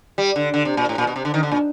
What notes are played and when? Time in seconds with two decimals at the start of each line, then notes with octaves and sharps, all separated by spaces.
0.18 G3
0.36 D3
0.54 D3
0.65 C3
0.77 A#2
0.89 A2
0.98 A#2
1.07 B2
1.16 C3
1.25 D3
1.34 D#3
1.43 D3
1.51 A#2